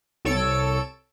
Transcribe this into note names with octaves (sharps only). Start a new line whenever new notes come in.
C2 A4 C#5 E6 D7